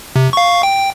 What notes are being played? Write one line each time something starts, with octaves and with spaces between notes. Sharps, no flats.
C3
F5 C#6
G5